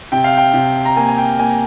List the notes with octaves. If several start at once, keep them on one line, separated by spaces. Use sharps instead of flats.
C3 G5
F5
G5
C3
A#5
A#3 G#5
G#5
G5
A#3 G#5